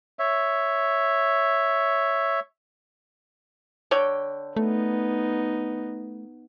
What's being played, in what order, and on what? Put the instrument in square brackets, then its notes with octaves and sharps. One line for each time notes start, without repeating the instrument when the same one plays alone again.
[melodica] C#5 E5
[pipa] D3 C#5 G5
[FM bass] A3 [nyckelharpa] B3 D#4